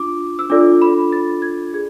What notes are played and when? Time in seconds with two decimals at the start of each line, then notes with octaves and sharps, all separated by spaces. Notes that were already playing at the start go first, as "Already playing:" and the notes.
Already playing: D4 F4 D6
0.39 E6
0.50 D4 F4 A4 D5 D6
0.82 B5
1.12 A6
1.42 G#6
1.74 G#4 G#6